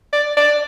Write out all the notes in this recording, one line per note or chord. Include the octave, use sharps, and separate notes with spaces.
D5
D5